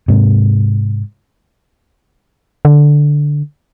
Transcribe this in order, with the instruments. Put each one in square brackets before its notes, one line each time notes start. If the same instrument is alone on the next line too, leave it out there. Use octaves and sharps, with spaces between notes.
[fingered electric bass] G#2 C3
[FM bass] D3